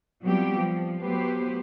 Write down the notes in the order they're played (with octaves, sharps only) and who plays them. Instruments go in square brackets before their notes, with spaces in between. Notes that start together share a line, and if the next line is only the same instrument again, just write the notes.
[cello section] F#3 G3 B3 C4 F4 G4
F3
F#3 A3 B3 G4 B4 C5